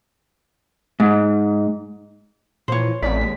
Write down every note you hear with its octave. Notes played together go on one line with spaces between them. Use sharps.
G#2
A#2 E3 F3 C5 C#5
A1 F2 D5 B6
D#2 G#3